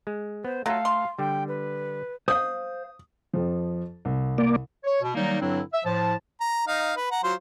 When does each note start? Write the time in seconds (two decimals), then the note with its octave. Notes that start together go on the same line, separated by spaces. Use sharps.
0.07 G#3
0.45 B3 C5
0.66 F#3 A3 F4 A4 F5
0.85 C6
1.19 D3 G3 G5
1.48 B4
2.28 C5 F5 D#6
3.33 F2 F3
4.05 C2
4.38 A#3 D5
4.84 C#5
5.01 B2
5.15 D#3 F#3 G3 A#3 D#4
5.41 G2 D3 F#3 C4 D4 E4
5.72 E5
5.85 A2 F3 A5
6.40 A#5
6.68 D#4 F5
6.97 B4
7.11 F#5 A#5
7.24 F#3 F4 C5